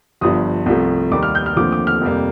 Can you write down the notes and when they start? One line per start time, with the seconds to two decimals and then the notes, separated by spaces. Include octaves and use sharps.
0.21 G1 G2 F3 D#6
0.66 C2 C3 F3 A3
1.11 D#2 D#3 G3 A#3 D6
1.23 F6
1.35 G6
1.46 F6
1.56 D#2 D3 F3 A3 C4 D6
1.72 D6
1.87 F6
2.02 F2 C3 G3 A#3